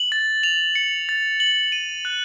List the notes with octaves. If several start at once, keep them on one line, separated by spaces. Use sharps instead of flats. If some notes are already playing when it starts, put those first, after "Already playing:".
Already playing: F#7
A6
F7
C#7
A6
F#7
D#7
F#6